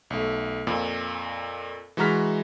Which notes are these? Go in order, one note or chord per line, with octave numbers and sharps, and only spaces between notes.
B1 A3
F2 A#2
E3 G#3 F#4 A#5 F6 B6